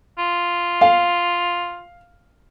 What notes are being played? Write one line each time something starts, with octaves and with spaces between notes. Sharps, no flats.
F4
F5